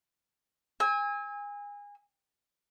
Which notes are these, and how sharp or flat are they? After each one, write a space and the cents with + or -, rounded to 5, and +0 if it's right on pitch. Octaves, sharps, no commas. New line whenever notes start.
G#5 -25 E6 -35